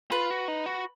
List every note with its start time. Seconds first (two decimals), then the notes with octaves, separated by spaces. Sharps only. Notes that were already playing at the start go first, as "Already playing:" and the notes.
0.11 F4 B4
0.30 F#4
0.48 D#4
0.66 F#4